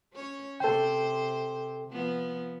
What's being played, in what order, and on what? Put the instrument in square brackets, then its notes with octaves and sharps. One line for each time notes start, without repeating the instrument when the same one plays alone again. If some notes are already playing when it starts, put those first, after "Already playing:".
[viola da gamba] C#4 C#5
[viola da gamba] C3 C5 [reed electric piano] A4 G5
[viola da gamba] F3 B3